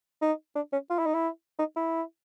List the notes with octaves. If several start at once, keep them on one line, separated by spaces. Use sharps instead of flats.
D#4
D4
C#4
F4
E4
D#4
E4
D#4
E4